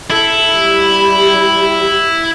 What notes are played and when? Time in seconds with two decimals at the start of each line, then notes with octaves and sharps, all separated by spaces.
0.11 E4 A4
0.55 G3 G4